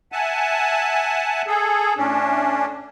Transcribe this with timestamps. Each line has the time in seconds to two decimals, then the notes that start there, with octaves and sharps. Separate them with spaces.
0.12 E5 F#5 G#5 A5
1.47 G#4 A4
1.97 A2 C#4 D4